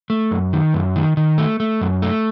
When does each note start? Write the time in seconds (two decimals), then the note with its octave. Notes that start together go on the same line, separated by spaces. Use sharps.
0.10 A3
0.31 F#2
0.53 D#3
0.74 F#2
0.96 D#3
1.17 D#3
1.38 A3
1.60 A3
1.81 F#2
2.02 A3